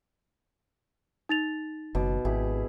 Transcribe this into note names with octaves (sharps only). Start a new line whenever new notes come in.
D#4 A6 F7
F#1 B2 D6
G#1 E4 G4 G#4